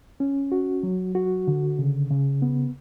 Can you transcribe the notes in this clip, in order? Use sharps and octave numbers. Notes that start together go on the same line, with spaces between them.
C#4
F#4
F#3
F#4
D3
C#3
C#3
B3